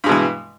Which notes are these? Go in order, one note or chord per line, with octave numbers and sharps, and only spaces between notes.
G2 B2 E3 G#3